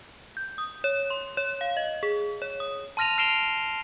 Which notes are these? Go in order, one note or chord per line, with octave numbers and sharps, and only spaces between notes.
G6
D#6
C#5
C6
C#5
F5
D#5
G#4
C#5
D#6
A5 C6 F6 A#6 D#7 F7
F6 C7 D7 E7 F7 G7